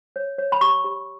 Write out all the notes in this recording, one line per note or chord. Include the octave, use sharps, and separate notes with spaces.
C#5
C#5
B5
G4 C#6
G4